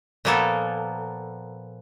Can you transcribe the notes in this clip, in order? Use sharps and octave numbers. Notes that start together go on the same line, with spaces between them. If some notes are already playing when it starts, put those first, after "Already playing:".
A#2 F3 A#3 B3 A4